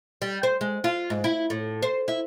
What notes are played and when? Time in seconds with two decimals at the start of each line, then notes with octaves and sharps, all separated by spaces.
0.22 G3
0.43 C5
0.61 G#3
0.84 F4
1.10 G#2
1.24 E4
1.50 A2
1.82 C5
2.08 E4